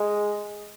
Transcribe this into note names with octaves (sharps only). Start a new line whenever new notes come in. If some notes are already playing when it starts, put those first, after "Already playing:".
Already playing: G#3